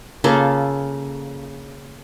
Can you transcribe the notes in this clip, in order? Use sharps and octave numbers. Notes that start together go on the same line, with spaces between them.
C#3 A#3 F4 A4